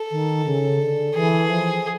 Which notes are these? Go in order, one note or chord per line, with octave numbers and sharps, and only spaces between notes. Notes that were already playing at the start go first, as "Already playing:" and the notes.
Already playing: A4
D#3
C#3
D3
E3 G#4
F3